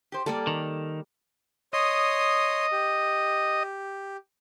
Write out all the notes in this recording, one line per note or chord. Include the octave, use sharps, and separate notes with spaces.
G4 C5
G3 A#3 A4 D5
D#3
C#5 D#5 C6 D#6
G4